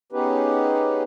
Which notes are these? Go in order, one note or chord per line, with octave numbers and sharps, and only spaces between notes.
B3 C#4 D#4 G4 G#4 B4